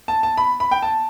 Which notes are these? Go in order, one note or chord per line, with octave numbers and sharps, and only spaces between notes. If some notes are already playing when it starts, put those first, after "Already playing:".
A5
A5
B5
B5
G5
A5